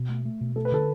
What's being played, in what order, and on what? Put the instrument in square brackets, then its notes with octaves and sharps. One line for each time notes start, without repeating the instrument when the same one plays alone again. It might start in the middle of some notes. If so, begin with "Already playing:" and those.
Already playing: [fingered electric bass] B2
A3
A3
B2
[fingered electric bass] A3 [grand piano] A4
[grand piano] B4
[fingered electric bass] D3 [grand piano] A4